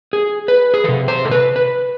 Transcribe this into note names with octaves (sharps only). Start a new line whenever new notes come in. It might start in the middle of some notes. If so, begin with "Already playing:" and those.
G#4
B4
G#4
C3 E3 A4
C5
A4
B4
B4